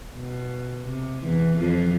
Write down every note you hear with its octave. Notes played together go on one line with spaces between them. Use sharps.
B2
C3
E2 E3
F2 F3